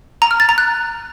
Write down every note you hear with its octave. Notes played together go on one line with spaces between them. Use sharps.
A#5
F6
A6
A#5
F#6